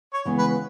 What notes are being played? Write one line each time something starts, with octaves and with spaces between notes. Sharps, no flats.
C#5
C#3 E3 G#3 B3
B4